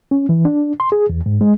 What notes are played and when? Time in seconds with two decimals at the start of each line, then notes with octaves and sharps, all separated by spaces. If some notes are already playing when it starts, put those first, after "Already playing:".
0.11 C#4
0.29 E3
0.45 D4
0.80 C6
0.92 G#4
1.10 E2
1.26 G#2
1.41 G#3